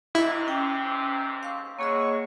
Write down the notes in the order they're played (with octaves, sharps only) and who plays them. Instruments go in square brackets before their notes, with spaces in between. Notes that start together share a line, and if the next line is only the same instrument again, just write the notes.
[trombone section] D#2 G#2 C3 [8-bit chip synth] E4 [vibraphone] D#5
[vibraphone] C#4 G5
F5 C#6
[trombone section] E3 G#3 F#4 [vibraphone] A#3 G#4 D#5 [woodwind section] C#5 C#6